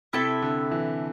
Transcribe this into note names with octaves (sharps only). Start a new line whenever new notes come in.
C3 E4 A4 E5 G5
D3
E3